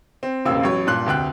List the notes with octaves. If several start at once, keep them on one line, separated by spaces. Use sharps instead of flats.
C4
E1 A1 C#3 A#3 C4 E6
A1 F#3 C#5
G2 A#2 F#6
F1 D2 G5 F#6